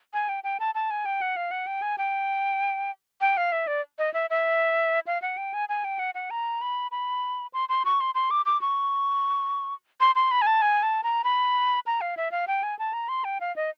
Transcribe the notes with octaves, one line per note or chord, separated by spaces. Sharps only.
G#5
G5
G5
A5
A5
G#5
G5
F#5
F5
F#5
G5
G#5
G5
G5
F5
E5
D5
D#5
E5
E5
F5
F#5
G5
G#5
G#5
G5
F#5
F#5
A#5
B5
B5
C6
C6
C#6
C6
C6
D6
D6
C#6
C6
C6
B5
G#5
A5
G#5
A5
A#5
B5
A#5
F5
E5
F5
G5
G#5
A5
A#5
C6
G5
F5
D#5